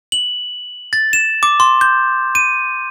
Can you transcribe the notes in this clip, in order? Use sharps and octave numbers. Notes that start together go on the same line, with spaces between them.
F#7
A6
E7
D6
C6
G6
D#7